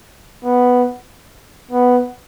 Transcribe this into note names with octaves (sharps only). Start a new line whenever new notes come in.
B3
B3